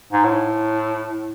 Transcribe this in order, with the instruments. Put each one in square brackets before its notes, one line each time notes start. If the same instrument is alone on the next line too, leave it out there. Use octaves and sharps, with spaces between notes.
[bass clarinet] G#2
A2